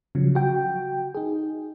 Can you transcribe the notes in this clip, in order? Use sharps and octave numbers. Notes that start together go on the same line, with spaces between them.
C#3 F3 F#3
F#4 G5
D#4 G#4